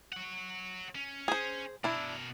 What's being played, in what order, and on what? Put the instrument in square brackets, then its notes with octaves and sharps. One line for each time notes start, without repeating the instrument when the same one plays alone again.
[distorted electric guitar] C#5 F#5
C#4
[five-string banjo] G#4 C5
[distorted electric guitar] B2 A#4 [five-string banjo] D4 E4